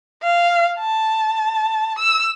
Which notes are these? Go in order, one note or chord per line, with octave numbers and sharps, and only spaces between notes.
F5
A5
E6